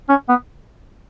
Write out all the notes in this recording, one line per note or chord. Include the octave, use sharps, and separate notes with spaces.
C#4
B3